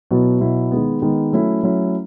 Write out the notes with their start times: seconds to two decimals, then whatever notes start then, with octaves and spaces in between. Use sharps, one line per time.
0.11 B2 F#3 B3 E4
0.41 B2 F#3 B3 E4
0.72 D#3 G#3 B3
1.02 D#3 G#3 B3
1.33 F#3 A3 C#4 E4
1.63 F#3 A3 C#4 E4